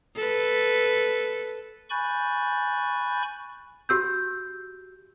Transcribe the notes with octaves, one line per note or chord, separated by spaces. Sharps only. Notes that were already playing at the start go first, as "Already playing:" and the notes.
A4 B4
G#5 B5 C#6 F#6 G6 A6
F#4 G4 E6 G6